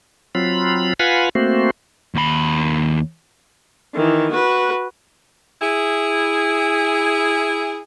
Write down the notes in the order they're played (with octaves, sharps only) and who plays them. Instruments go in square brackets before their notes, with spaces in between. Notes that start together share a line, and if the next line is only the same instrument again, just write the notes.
[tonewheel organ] F#3 C4 F4 B5
F4 B4 F5 F#5 G#5 B5
A3 A#3 C4 F#4 C5
[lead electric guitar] D#2 B5
[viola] D#3 E3
F#4 B4
[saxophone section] E4 G#4